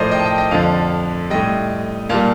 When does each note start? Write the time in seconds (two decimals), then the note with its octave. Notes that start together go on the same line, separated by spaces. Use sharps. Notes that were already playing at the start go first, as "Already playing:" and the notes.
Already playing: A2 F3 A#4 C5 D5 D#5
0.11 D#5 G5
0.19 A5
0.25 D#5 G5
0.38 D#5 G5
0.51 F2 D3 F3 F5 A5
1.30 A2 G3 D#5 G5
2.09 A#2 G3 F5 A5